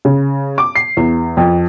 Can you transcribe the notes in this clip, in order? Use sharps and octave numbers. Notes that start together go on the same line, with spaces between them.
C#3
D6
C7
E2
F2